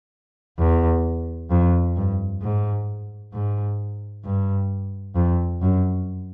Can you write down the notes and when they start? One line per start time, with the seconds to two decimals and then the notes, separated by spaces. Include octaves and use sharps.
0.59 E2
1.51 F2
1.96 G2
2.42 G#2
3.33 G#2
4.25 G2
5.15 F2
5.62 F#2